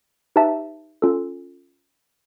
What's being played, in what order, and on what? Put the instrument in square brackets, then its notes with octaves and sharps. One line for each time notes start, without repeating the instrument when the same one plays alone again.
[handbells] D#4 G4 B4 E5 A5
C#4 F4 A4